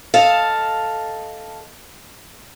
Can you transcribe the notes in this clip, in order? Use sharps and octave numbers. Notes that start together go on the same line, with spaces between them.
A4 D#5 F5 A5